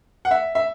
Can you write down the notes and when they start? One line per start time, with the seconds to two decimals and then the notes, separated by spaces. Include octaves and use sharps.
0.25 F#5
0.31 E5
0.55 E5